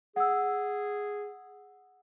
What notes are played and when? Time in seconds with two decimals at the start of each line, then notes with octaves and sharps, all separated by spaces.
0.16 G#4 F#5 E6